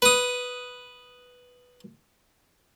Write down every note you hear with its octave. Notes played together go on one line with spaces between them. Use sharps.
B4 D#6